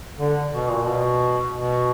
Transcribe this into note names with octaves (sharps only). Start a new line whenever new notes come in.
D3
B2
A#2
B2
B2